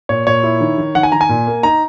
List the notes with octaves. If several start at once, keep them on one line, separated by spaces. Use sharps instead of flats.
A#2 C#5
A#2 C#5
E4
D#3
D#3
D#3 F#5
G#5
D#3 A#5
G#5
A#2
A#3
D#4 A#5